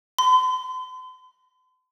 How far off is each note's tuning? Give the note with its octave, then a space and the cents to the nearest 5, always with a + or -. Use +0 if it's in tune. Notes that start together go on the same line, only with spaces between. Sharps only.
C6 -45